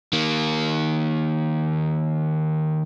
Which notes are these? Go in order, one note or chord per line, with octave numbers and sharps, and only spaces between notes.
D#3 A#3